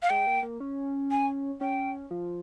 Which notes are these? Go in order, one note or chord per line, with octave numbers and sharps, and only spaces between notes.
F5
G#3 G5
A#3
A#3
C#4
G#5
C#4 G5
F3